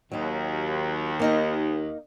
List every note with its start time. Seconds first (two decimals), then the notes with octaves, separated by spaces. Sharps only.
0.12 D#2 F#3 D#4
1.20 A#3 D#4 D#5